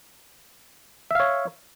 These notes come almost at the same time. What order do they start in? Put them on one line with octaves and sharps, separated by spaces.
E5 F5 C#5